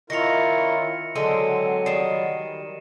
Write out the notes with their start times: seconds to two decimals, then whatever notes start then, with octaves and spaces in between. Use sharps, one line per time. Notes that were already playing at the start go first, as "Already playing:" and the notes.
0.10 D#3 C#4 E4 F4 A#4 A#6 C#7 F7
1.15 D3 F#3 G#3 C4 D#7
1.86 D#3 G3 C7 E7